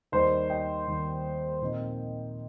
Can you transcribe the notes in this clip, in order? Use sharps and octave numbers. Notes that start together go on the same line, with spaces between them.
D#2 D#3 G3 D#4 C5
D#5 G5
D#2 D#3 G3 D#4
A#2 F3 C4 D#4